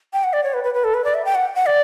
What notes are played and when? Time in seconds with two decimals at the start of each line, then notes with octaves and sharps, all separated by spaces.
0.13 G5
0.24 F#5
0.33 D5
0.44 C#5
0.54 B4
0.64 B4
0.74 B4
0.84 A4
0.94 B4
1.04 D5
1.14 E5
1.25 G5
1.35 F#5
1.55 F#5
1.66 D5